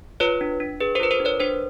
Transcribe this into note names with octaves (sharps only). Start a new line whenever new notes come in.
F4 B4 C#5
D4
D4
G#4 B4
A#4 C5
F4 B4
A#4 C5
D4
B4 C#5
D4 A#4 C5